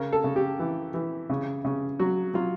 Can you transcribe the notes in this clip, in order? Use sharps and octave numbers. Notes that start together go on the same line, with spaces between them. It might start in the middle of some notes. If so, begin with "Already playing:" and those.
Already playing: C#3 A#4
A4
C#3
G4
E3
E3
C#3
C#3
F#3 F#4
F#3 F4